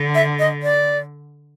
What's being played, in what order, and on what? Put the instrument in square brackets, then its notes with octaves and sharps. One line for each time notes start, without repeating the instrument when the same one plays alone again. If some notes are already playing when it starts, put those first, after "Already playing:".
Already playing: [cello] D3
[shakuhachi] E5
D#5
D5